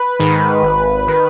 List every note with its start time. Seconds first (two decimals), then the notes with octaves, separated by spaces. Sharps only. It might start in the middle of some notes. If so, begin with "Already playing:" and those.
Already playing: B4
0.19 G#2 D#3
0.63 G#1
1.08 D#3